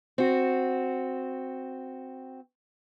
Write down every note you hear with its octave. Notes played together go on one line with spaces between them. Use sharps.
C4 F#4